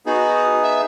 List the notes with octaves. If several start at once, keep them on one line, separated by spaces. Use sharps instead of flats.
B3 D#4 F#4 G#4
E5